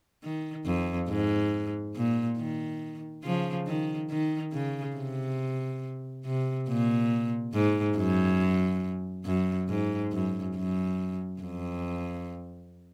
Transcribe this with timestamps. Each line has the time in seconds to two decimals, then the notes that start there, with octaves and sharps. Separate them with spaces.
0.23 D#3
0.66 F2
1.09 G#2
1.95 A#2
2.38 D#3
3.24 C#3 F3
3.67 D#3
4.10 D#3
4.53 C#3
4.96 C3
6.25 C3
6.68 A#2
7.54 G#2
7.97 F#2
9.26 F#2
9.69 G#2
10.12 F#2
10.55 F#2
11.41 F2